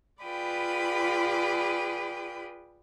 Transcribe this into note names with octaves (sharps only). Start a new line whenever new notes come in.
F4 G#4 B4 D5 G5 B5